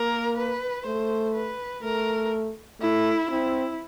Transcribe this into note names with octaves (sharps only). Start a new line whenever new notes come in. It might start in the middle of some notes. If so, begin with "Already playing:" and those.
Already playing: A#3 A#4
B4
A3 C5
B4
A3 A#4
A3 E4
C4 E4